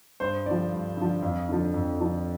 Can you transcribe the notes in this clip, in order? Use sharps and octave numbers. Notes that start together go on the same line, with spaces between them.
G2 C5
D3 F3 D5
G2
D3 F3
F2 F5
D3 F3
F2
D3 F3